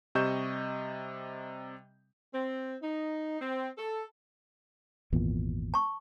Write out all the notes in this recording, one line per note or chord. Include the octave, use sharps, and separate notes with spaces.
C3 G3 D#5 C#6 G6 E7
C4
D#4
C4
A4
G#1 E2 A#2
A5 C#6